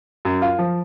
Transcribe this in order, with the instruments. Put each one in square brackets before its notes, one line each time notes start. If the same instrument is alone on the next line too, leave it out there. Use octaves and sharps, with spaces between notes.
[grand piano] F#2
F4
F3